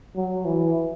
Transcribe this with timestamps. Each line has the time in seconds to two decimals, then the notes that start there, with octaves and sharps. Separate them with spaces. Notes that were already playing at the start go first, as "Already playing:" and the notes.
0.16 F#3
0.45 E3